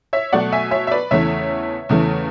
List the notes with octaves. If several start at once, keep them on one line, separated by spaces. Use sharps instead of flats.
C#5 E5
B2 F#3 A3 D5 F#5
E5 G#5
C#5 E5
E5
B4 D5
E2 C#3 E3 A3 C#5 E5
E2 C#3 E3 A3